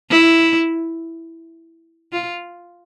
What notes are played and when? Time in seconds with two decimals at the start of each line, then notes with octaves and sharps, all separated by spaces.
0.10 E4
2.12 F4